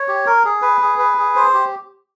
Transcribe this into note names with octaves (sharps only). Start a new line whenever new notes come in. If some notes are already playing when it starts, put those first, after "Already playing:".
Already playing: C#5
G4
A#4
G#4
B4
G#4
B4
G#4
C5
G4